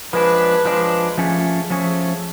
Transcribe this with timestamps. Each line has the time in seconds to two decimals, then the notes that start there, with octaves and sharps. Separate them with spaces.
0.13 F3 G#3 D4 B4
0.65 F3 G#3 D4
1.18 F3 A3 C#4 G#4
1.70 F3 A3 C#4 G#4